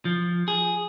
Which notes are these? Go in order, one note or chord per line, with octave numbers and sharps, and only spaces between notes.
F3
G#4